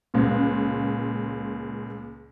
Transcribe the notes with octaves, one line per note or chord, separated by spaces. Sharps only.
C#2 A#2